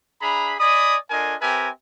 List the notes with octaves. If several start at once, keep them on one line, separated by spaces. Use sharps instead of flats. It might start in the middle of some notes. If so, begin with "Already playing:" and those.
D4 G#4 E5 A#5 B5
D5 D#5 G#5 B5 D#6
D4 F4 A4 A#4 D#5 G#5
C4 G4 A#4 B4 E5 G#5